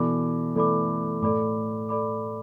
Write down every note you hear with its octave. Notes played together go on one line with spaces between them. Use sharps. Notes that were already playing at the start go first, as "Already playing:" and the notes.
Already playing: B2 E3 A4 D5 B5 D6
E3 A3 A4 D5 B5 D6
A2 A4 D5 B5 D6
A4 D5 B5 D6